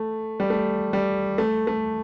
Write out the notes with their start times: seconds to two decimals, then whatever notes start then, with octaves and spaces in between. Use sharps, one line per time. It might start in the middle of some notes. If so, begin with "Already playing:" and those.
Already playing: A3
0.40 G3
0.50 A3
0.93 G3
1.38 A3
1.67 A3